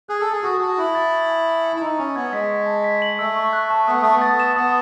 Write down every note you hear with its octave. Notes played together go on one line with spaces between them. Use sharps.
G#4 F#6
A4
A6
G#4
F#4 D#6
F#4 A5
E4 F#6
A6
C#6
G#5
A6
C#7
E4
D#4 E6
C#4 C#6
B3 G#6
G#3 B6
C#6
A5
B6
F#7
A3 E6
C#6
F#6
A5
B3 D#6
A3 A5
B3
A6
E7
B3 D#6